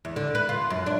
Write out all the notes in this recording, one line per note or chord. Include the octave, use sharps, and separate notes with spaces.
E2
D3
B4
F4
F#2
D4